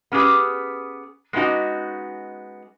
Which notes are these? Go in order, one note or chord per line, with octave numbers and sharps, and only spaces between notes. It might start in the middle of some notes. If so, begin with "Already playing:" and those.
B3 C#4 G4 G#4 B4
G#3 B3 C#4 D#4 F#4